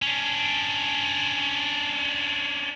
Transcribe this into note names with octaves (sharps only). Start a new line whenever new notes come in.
C#4 D4